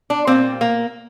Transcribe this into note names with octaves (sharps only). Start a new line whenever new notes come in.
D4
A#2 G3 A#3 C4
A#3